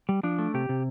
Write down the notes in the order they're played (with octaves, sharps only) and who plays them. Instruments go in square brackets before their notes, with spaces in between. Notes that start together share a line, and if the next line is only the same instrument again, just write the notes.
[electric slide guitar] G3
F3 D4
A3
C3 G4
C3